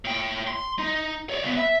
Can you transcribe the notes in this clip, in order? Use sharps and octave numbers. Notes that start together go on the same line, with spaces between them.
A2 G5
C6
D#4
C#5 D5
C#2 B3
E5